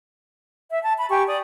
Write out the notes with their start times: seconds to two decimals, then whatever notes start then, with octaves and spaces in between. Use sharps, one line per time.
0.69 E5
0.81 A5
0.96 B5
1.09 G4 G#5 C#6
1.26 D5 D#6